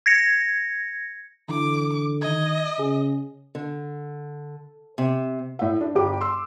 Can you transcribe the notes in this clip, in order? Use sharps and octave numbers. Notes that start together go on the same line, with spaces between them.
G#6 A#6 C#7
D3 E3 D6
D#3 D#5 G#6
C#3 G#4
D3
C3
A2 E5
D4
G1 G4 D6
C6 E6